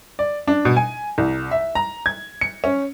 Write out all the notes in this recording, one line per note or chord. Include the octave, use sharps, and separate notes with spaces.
D5
D4
B2
G#5
C2
E5
A#5
G#6
C#7
C#4